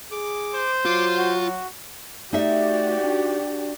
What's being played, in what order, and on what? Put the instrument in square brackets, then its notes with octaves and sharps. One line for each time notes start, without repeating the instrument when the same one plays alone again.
[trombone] G#4 [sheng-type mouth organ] D6
[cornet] C5
[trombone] F#3 [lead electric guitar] F4 [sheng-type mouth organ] C6 D6
[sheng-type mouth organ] F#4
[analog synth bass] A3 [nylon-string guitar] D#4 E5 [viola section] F#4 G4 [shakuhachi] D5
[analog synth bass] D4